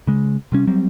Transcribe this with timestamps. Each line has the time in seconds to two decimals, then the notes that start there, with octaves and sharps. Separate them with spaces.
0.07 C#3 G#3
0.52 C3 G3 C#4
0.67 F#3 G3 C4